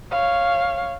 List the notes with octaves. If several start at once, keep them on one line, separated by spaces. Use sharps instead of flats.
C#5 F5